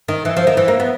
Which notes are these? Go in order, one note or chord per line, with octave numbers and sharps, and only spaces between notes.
D#3
E3
F3
D#3
E3
A#3
B3